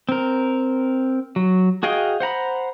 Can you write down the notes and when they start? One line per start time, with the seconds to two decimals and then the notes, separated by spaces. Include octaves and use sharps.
0.09 C4 A#4
1.36 F#3
1.83 F#4 G#4 D#5 F5 G5
2.20 C5 F#5 A#5 B5